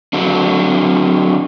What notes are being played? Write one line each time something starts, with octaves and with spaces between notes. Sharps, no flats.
D3 F#3 C4 D4